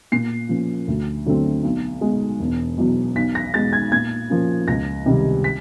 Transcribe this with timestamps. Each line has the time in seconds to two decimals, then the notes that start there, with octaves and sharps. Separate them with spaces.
0.12 A#2 C7
0.49 F3 A#3 C#4
0.88 D2
1.26 D3 F#3 A3 C4
1.63 B1
2.01 B2 G#3
2.39 E1
2.78 E2 B2 F#3
3.16 B1 B6
3.35 A#6
3.54 B2 G#3 A6
3.73 G#6
3.92 A#2 G#6
4.29 F3 A#3 C#4
4.68 C#2 A#6
5.05 C3 D#3 G3 B3
5.44 B6